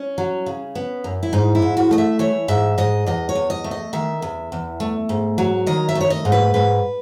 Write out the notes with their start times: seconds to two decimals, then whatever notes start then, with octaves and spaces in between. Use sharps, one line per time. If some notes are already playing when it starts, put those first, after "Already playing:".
Already playing: C#4
0.18 F#3
0.46 C#3
0.75 B3
1.04 F#2
1.23 E4
1.33 G#2 D#4
1.55 E4
1.62 G#2
1.77 F#4
1.91 A3 D#5
1.98 E5
2.19 E3 C#5
2.48 G#2 E5
2.78 G#2 D#5
3.06 E2 D#5
3.29 C#5
3.35 E2
3.50 D#5
3.64 A3
3.71 D#5
3.93 D#3 E5
4.22 E2
4.52 E2
4.80 A3
5.09 G#2
5.38 F#3
5.67 D#3 D#5
5.89 E5
5.95 A3
6.01 C#5
6.10 D#5
6.25 G#2
6.32 B4
6.54 G#2 B4